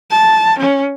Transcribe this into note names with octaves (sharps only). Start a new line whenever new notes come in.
A5
C#4